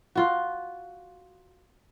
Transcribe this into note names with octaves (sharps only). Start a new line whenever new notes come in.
F4 F#4